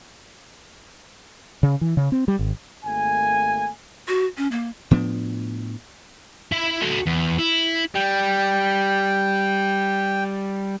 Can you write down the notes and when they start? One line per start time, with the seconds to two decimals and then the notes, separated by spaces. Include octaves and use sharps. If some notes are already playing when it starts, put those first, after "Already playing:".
1.63 C#3
1.81 E3
1.97 C#3
2.12 C4
2.28 G3
2.39 G#1
2.85 G#1 A3 A#3 G#5
4.08 F#4
4.37 C#4
4.51 A#3
4.91 A2 F3 B3 D4
6.52 E4 E5
6.82 F#4 A4
7.07 E2
7.39 E4
7.95 G3 G5